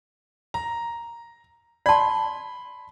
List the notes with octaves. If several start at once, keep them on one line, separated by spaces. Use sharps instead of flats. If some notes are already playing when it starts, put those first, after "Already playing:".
A#5
D5 A5 B5 C6